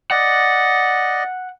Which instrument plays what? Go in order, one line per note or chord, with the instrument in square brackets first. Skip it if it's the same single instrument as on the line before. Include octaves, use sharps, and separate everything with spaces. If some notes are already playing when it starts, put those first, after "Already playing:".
[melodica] D5 D#5 [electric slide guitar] F#5